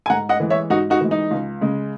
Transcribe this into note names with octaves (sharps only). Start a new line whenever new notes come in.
G#5
G#2 F#5 A#5
D#5 F#5
E3 G#3
C#5 E5
G#2 D#4 F#4
D#4 F#4
E3 G#3
D#4
C#2
C#3 G#3